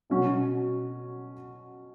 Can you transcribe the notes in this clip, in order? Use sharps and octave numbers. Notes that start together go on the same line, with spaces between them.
B2 F#3 C#4 F#4